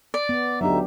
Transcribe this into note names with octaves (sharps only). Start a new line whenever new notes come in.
D5
B3
D2 F#3 D4 D#4 G4 E5